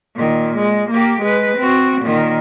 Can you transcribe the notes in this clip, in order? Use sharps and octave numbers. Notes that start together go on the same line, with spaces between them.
A#2 D#3
G#3
A#3 G4
G#3 B4
C4 F#4
A#2 D#3